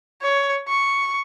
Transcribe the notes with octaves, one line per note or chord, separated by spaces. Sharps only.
C#5
C#6